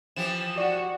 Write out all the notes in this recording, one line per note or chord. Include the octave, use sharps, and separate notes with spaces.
E3 F3 G4 E7
F#4 D5